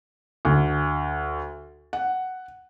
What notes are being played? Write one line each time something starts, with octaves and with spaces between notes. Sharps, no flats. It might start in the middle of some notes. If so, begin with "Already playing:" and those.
D2
F#5